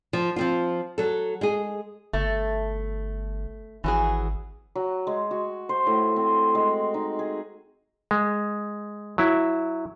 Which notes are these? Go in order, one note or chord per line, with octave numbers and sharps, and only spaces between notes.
F3
F3 C4 F4
F#3 A4
G#3 G#4
G1 A3
G#1 E3 F#3 G#4
F#3
G#3
F#4
C5
A2
C4
G#3
D#4
G#4
G#3
F#3 E4